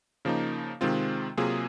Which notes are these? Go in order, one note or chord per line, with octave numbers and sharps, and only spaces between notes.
C#3 F3 A#3 D#4
C3 D#3 G#3 C4 F4
C3 F#3 A#3 F4 G#4